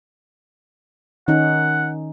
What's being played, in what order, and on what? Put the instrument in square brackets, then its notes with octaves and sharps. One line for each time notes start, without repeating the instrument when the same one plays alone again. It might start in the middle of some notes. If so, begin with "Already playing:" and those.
[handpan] D#3 C#4 D#4 [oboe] F#5